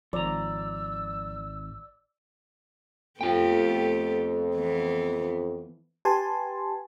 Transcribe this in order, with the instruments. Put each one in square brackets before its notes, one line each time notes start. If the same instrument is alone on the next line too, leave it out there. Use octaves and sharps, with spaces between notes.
[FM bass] G#1 [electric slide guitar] F3 A#5 [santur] D5 [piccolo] E6
[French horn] F2 [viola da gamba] A3 B3 G4 [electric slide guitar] F4 G5
[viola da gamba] E3 B3
[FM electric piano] G4 B4 G#5 A5 C6